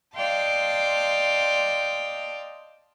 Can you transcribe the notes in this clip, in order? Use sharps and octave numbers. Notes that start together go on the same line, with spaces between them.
D5 D#5 F5 G5 A5 C6